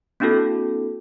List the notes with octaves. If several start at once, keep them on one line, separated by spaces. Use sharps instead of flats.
A#3 C4 D4 E4 F#4 A4